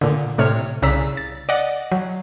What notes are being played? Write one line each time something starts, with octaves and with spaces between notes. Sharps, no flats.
A#2 D3
A2 C3 C#5 F6
C2 C#3 D5 A#5 E6 B6
A6
D5 D#5 F#5 A#6
F#3